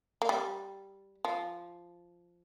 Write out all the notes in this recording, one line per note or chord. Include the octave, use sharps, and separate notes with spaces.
A#3
G3
F3